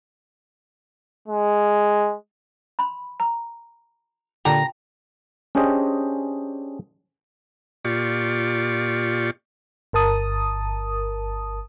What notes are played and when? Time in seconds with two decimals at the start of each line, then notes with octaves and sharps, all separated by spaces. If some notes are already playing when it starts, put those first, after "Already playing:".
1.28 G#3
2.79 B5 C6
3.20 A#5
4.45 A#2 D3 F4 G4 G5 A5 A#5
5.55 C#4 D4 G4 G#4 C5 D#5
7.85 A#2 F4 G4 D5 C#6
9.93 G1 A#4 A5 D#6